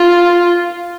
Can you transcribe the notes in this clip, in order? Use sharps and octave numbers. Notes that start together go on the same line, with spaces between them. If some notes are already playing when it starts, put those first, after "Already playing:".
Already playing: F4